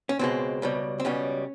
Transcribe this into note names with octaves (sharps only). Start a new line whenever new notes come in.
C#4
C#2 B2 G#3 C4
C#2 B2 G3
C4
C#2 B2 G3 C#4